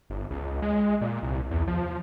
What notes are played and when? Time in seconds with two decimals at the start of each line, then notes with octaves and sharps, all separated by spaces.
0.10 G1
0.31 C#2
0.62 G#3
1.01 A#2
1.23 C2
1.51 E2
1.67 F3